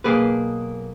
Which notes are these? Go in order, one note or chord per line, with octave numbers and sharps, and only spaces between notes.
B1 A#3 G#4 B4